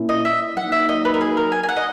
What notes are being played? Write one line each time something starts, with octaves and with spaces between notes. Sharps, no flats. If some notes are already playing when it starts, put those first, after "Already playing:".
Already playing: A#2 A#3 C#4 E4
D#5
E5
F#3 A#3 D#4 F#5
E5
D#5
B4
A#4
G#4
A#4
G#5
G#5
F#5
D#5